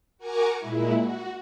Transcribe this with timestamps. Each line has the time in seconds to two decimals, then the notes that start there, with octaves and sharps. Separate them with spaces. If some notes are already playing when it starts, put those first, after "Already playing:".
0.18 F#4 A#4 G#5 A#5 C#6 D6
0.59 A#2 G#3 E4
0.95 F#4